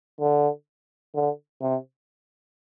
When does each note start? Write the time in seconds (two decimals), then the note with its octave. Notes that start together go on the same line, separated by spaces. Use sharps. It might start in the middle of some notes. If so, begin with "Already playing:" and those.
0.20 D3
1.14 D3
1.61 C3